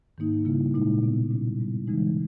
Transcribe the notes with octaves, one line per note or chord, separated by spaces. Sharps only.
G#2 D#3 A#3 D#4
C#3 G3 A#3 E4
A#2 G#3 D#4
B2 G#3 B3 D#4
A#2 G3 C#4 E4
G2 G3 B3 E4
C#3 E3 G#3 D#4